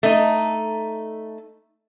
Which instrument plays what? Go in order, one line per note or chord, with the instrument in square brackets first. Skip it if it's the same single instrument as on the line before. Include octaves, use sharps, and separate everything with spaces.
[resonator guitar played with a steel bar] A3 D#4